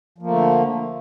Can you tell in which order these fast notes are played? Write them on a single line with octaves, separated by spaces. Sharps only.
F3 A#3 A3 D3